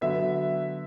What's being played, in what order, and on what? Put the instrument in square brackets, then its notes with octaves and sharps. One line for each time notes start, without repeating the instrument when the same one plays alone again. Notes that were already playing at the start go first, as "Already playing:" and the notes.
[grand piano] D3 F#3 B3 E5